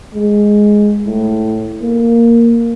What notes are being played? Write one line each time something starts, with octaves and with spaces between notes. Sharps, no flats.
G#3
A2
A#3